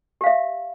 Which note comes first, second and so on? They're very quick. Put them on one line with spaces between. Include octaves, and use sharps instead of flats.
G4 F5 E5